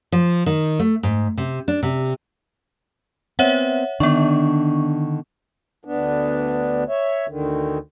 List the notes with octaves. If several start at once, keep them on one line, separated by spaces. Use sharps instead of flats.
F3
D#3
A3
G#2
C3
D4
C3
B3 C4 C#5 E5 F#5
D3 D#3 B3 D4 C#6
D2 B3 D4
C#5 E5
D2 D3 D#3